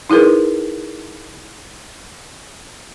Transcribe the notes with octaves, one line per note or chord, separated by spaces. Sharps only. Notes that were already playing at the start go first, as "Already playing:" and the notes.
D#4 E4 G#4 A#4 B4